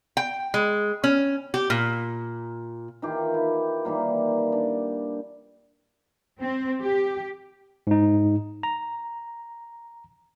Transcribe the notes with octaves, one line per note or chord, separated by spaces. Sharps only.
G5
G#3
C#4
G4
A#2
D#3 E3 F4 G4
E4
D#3 E3 G3 A#3
D4
C4
G4
G#2 D#4
A#5